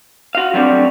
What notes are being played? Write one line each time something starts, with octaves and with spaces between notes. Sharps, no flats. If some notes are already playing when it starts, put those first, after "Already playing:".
F#4 F5
F#3 G3 A3 C4 D4 F#4